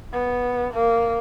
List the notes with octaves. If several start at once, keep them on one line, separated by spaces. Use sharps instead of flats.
B3
A#3